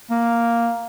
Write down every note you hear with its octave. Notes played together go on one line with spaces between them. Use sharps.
A#3